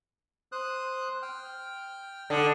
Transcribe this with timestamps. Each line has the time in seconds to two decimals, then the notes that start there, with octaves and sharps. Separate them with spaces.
0.52 C5 D#6 F#6
1.22 G5 F6
2.30 D3 A4 D#5 F6